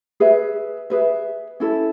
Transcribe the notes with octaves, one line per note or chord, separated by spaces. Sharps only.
G#4 B4 E5
G#4 B4 E5
C#4 E4 A4